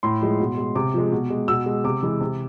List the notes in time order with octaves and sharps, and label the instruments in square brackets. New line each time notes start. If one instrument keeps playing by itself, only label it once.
[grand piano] A2 C6
F3 G#3
B2
G#3
C3 D6
F3 G#3
B2
G#3
B2 E6
G#3
C3 D6
E3 G#3
C3